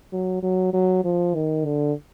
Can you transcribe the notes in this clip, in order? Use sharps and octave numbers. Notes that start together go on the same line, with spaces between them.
F#3
F#3
F#3
F3
D#3
D3